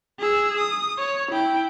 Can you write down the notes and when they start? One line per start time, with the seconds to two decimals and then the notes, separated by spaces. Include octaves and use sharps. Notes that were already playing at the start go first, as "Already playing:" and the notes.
0.19 G#4 E6
0.59 D#6
0.98 C#5
1.31 E4 G5